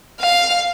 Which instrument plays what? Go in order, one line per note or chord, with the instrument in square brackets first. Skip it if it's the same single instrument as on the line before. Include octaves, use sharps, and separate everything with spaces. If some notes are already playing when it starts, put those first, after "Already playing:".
[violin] F5